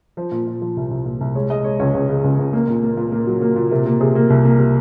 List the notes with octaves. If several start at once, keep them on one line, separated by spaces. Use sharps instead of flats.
F3 C5
A#2
A#2
F3
C2
C2
A#2
C2
G#3 C#5
G#3 D#5
G#3 C#5
C#2 C#5
C#2 C#5
C#3
C#2
C#2
A#3
A#2
A#3
A#2
A#3
F#3
A#3
A#2
C3 A#4
A#3
C3 G#4
A#3
C2
A#3
C3